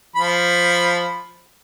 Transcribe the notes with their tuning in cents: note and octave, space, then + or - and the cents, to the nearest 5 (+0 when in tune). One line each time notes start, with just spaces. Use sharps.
F3 +0 B5 +5